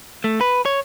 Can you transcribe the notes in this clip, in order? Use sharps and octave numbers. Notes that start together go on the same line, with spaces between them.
A3
B4
C#5